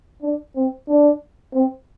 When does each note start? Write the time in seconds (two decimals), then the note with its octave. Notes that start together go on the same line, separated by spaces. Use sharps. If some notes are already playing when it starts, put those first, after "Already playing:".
0.22 D4
0.56 C4
0.88 D4
1.53 C4